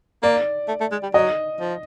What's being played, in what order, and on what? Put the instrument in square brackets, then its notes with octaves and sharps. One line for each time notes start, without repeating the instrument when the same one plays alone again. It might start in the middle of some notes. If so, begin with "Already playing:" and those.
[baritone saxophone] A#3 [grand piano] D5
[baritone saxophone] A3
A3
G#3
G3
[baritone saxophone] F#3 [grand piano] D#5
[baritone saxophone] F3